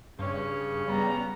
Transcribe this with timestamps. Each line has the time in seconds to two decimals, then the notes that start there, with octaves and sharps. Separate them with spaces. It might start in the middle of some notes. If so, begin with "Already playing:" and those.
0.19 G2 C#3 C#4
0.88 G3 B3 A#5